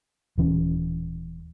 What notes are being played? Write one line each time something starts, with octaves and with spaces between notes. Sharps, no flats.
D#1 E3 C#4